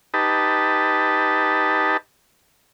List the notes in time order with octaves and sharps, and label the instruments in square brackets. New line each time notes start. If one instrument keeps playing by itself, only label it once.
[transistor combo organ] D#4 G4 B4 A5